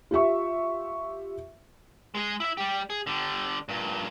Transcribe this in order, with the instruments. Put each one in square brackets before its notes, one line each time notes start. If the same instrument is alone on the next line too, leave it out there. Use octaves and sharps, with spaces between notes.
[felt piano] F4 G4 E5 C#6
[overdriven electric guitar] G#3 G#4
E4 E5
G3 G4
G#4
D3 G3
G2 A#2